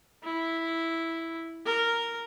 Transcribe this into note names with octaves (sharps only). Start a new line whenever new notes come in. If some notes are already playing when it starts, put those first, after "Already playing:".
E4
A#4